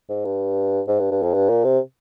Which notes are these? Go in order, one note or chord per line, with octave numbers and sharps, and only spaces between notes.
G#2
G2
G#2
G2
G2
F2
G2
A#2
C3